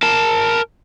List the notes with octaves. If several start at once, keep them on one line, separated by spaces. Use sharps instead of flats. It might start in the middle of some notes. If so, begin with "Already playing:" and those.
A#4 A5